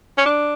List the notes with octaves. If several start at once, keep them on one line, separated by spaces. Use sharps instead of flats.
C#4
D4